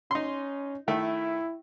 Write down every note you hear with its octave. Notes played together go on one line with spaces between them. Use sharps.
C#4 D#4 C6
D#3 A3 E4